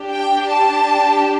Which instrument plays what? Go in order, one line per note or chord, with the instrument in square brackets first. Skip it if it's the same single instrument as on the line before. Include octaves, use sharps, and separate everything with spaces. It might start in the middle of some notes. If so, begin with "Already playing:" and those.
Already playing: [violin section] D4 G4
G5
A5